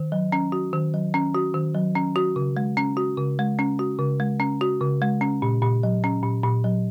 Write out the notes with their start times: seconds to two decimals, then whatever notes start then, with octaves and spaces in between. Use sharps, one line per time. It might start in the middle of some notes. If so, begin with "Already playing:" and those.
Already playing: D#3
0.12 F#3
0.32 C#4
0.52 F#4
0.73 D#3
0.94 F#3
1.14 C#4
1.35 F#4
1.54 D#3
1.75 F#3
1.95 C#4
2.16 F#4
2.36 C#3
2.57 G#3
2.77 C#4
2.97 F#4
3.18 C#3
3.39 G#3
3.59 C#4
3.79 F#4
3.99 C#3
4.20 G#3
4.40 C#4
4.61 F#4
4.81 C#3
5.01 G#3
5.21 C#4
5.42 A#2
5.62 A#2
5.83 F#3
6.04 C#4
6.23 A#2
6.44 A#2
6.64 F#3